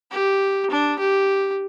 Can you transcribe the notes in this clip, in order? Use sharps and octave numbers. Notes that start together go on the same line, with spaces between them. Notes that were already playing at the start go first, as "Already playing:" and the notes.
G4
D4
G4